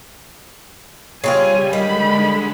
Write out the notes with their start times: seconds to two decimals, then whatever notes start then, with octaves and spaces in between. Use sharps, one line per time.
1.24 C#3 G3 C4 F4 G#5
1.73 D3 D#3 G#3 B5